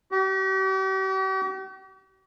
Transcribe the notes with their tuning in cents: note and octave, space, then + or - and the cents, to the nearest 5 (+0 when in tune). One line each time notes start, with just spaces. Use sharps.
G4 -45